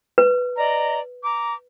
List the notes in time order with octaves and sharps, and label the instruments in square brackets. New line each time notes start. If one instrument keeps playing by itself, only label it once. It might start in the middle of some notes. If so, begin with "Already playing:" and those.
[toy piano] B4
[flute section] D5 D#5 A#5
A#5 D6